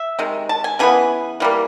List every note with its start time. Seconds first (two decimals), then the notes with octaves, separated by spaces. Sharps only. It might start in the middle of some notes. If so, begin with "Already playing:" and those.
Already playing: E5
0.19 C3 D#3 G#3
0.49 A5
0.64 G#5
0.79 C#3 E3 B3 G#5
1.40 E3 G3 A#3